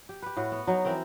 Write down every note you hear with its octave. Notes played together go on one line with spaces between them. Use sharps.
G4
G4 B4
A2 F#4
B3
F#3 D#4
E3 C4 A#4 G5